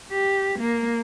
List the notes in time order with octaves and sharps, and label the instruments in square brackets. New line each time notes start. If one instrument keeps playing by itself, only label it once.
[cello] G4
A#3